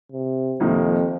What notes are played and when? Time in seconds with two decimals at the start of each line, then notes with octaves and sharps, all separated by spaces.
0.12 C3
0.60 C2 F2 C3 D#3 A#3 D#4